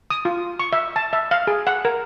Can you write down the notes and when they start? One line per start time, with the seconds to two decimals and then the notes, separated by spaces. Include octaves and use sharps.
0.10 D#6
0.25 F4
0.60 C#6
0.73 E5
0.96 A5
1.13 E5
1.31 F5
1.47 G#4
1.67 F#5
1.85 A#4